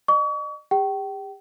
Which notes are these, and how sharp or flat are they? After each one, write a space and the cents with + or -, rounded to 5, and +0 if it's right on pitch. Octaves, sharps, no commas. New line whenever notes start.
D#5 -40 C#6 +40
G4 +40 G5 -30